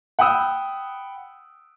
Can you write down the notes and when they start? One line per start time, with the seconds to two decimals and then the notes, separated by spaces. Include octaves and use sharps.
0.19 F#5 G5 B5 D#6 E6